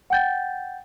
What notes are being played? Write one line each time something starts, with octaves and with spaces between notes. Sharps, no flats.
F#5 G5 G6 A6